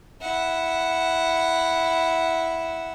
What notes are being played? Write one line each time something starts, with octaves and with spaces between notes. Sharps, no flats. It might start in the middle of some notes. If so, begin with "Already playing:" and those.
E4 F#5